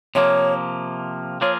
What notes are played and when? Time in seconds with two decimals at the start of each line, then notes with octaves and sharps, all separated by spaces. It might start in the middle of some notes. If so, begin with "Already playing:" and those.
0.15 C3 F3 A#3 C#5
1.41 F3 A#3 F4 G#4 C#5